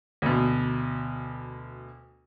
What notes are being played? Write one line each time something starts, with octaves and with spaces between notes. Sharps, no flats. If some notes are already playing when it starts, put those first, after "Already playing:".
D2 B2